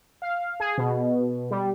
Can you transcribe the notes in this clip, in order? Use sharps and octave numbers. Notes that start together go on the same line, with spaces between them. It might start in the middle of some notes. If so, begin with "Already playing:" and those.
F5
G#4
B2
G3